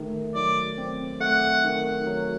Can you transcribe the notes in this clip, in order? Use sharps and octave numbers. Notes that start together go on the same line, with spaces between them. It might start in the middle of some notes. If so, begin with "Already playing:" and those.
Already playing: D#3 A3
F#3 D5
C4
A3 F#5
D#3
F#3